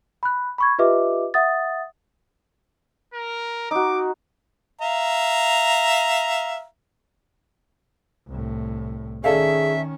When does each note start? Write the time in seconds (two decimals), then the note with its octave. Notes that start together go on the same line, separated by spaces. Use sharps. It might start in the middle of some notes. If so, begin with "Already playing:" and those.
0.23 B5 F#6
0.58 B5 C#6 G#6
0.79 F4 G4 B4 D#5 E5 D6
1.34 E5 F#5 D#6 A6
3.14 A#4
3.71 D#4 F#4 D6
4.81 E5 F5 A#5
8.28 C2 A2
9.24 D#3 C#4 G#4 A4 D5 E5 F5